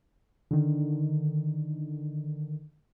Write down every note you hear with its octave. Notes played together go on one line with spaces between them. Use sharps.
D3 D#3